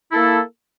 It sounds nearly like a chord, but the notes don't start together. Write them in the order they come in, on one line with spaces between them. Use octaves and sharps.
E4 A4 A#3